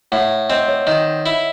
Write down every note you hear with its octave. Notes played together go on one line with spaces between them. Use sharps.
A2 F#5
C4 D#5
C#5
D#3 D#5
E4